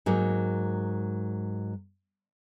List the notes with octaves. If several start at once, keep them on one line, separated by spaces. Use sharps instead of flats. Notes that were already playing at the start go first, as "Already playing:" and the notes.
G#2 F#3 A#3